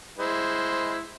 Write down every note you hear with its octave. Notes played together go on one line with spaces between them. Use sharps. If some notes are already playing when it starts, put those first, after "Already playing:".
G#3 E4 C5